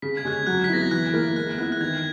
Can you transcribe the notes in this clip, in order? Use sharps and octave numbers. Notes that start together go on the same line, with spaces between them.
C#3 B6
G#6
G#3 C#4 G#4 F#6
G#6
F#3 F#6
B6
B3 E4 A#6
G#6
E3 F#6
A#3 E4 A#4
G#3 F#6
B3 E4 F#6
F#6
D#3 G#6